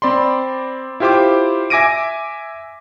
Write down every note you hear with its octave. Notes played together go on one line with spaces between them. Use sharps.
C4 D5 B5 C6
E4 F4 G4 C5 C6 D6
E5 G#5 D6 A#6 D7 D#7